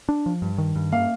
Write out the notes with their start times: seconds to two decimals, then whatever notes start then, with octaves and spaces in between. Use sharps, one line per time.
0.09 D4
0.26 F3
0.42 G2
0.58 D#3
0.75 G2
0.92 A#3 F5